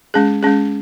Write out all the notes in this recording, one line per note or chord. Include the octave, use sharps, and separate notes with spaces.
G#3 C#4 G#4
G#3 C#4 G#4